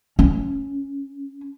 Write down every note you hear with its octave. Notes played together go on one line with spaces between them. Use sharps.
C#4